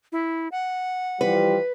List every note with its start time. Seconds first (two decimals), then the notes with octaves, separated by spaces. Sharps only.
0.12 E4
0.52 F#5
1.21 E3 F3 G3 B4